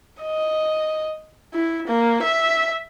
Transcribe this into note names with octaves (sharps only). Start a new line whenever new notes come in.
D#5
E4
A#3
E5